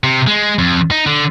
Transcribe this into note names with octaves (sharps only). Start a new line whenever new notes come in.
C3
G#3
F2
D#4
D3